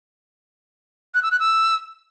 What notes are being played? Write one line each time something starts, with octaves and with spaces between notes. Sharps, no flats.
F#6
E6
F#6
E6